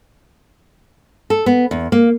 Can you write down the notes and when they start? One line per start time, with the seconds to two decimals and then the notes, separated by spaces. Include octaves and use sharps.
1.30 A4
1.46 B3
1.71 E2
1.92 A#3